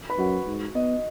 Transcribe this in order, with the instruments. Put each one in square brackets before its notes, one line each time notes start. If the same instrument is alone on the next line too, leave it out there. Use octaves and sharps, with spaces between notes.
[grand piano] B4 B5
[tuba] F#2 [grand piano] F#4 F#5
[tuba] G#2
[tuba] B3 [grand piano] D#5